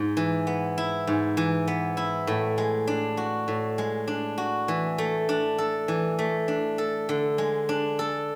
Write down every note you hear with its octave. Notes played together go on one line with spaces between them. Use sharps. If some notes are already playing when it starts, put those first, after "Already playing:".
Already playing: G#2
E3
B3
E4
G#2
E3
B3
E4
A2
G#3
D4
F#4
A2
G#3
D4
F#4
E3
A3
D4
A4
E3
A3
D4
A4
D3
G#3
D4
A4